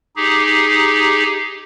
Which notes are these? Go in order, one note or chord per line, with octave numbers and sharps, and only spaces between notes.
D#4 G4 G#4